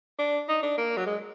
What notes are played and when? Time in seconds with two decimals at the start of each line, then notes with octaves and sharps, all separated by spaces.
0.19 D4
0.49 D#4
0.63 D4
0.78 A#3
0.97 F#3
1.07 G#3